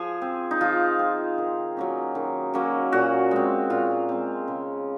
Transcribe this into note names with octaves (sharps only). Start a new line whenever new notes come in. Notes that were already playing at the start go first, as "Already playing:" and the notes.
Already playing: F3 G#4
C4
D#4
F3 F4
C4
D#3
F#3 A#3 C#4
D#3
F#3 A#3 C#4
A#2 F#4
G#3 C4
A#2 F4
G#3 C4
C#3